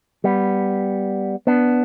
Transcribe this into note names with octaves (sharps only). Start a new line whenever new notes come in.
G3 B3
B3 D4